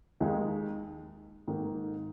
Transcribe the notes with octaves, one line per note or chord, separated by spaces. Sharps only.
D#2 D#3 G#3 D#4 G#4
G#2 D#3 A#3